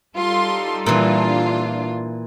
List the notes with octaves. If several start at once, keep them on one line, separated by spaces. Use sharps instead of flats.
G3 D#4 F4 A4 C6
A#2 E3 D4 F4